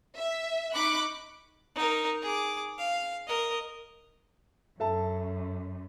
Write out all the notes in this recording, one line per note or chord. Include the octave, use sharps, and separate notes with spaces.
E5
D#4 B5 C#6 D6 F#6
D#4 A#4
G#4 D6
F5
A#4 D#5
F#2 A4 E5 A5